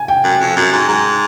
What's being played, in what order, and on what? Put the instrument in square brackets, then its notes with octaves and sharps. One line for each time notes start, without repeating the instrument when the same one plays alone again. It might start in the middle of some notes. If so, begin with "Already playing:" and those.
Already playing: [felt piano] G#5
G5
[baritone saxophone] F#2
F2
F#2
G#2
G#2